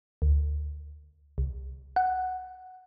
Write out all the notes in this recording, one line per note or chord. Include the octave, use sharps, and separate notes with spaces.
D2
C2
F#5